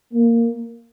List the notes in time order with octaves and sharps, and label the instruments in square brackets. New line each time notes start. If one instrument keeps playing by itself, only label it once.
[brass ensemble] A#3